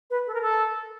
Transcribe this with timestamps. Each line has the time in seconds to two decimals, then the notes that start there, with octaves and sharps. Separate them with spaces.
0.10 B4
0.27 A4
0.34 A#4
0.41 A4